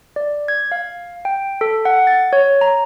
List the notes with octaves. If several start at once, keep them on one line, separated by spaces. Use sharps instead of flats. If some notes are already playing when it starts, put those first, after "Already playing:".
D5
G#6
F5
G5
A4
F#5
A6
C#5
A#5